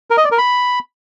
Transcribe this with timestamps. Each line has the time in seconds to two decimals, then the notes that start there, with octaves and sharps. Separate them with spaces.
0.10 A#4
0.17 D#5
0.24 D5
0.31 A#4
0.38 B5